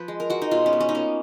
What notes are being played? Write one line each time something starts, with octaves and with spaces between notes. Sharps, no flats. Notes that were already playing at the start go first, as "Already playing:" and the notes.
Already playing: F3 B4
G#3
A#4
G#3 F#4
D#4
B2 F4
C#4
B3
C#4
D#4
A#3 C#4